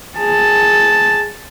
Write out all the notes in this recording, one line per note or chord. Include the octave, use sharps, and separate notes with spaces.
G#4 A5